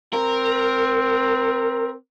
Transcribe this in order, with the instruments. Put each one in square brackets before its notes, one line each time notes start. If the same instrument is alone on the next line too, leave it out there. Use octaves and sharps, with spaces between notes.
[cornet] C4 [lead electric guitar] A#4